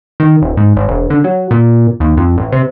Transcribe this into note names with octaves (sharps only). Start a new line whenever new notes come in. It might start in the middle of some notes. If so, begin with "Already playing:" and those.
D#3
D#1
G#2
G#1
E1
D3
F#3
A#2
D#2
F2
A1
C3